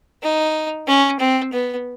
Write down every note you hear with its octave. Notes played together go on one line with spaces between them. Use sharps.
D#4
C#4
C4
B3